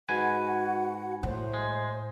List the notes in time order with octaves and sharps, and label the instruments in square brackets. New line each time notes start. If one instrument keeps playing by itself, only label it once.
[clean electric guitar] G#2 B4 G#5 [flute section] F#4 F#5
[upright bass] A2 [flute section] C5
[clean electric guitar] G#3